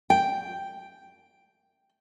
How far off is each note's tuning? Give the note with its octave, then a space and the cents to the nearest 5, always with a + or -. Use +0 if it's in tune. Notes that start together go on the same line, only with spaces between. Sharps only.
G5 +0